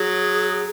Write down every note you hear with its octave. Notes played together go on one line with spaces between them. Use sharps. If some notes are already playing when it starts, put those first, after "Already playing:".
Already playing: F#3 G#4